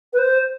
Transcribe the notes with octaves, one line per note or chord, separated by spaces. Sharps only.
B4
C5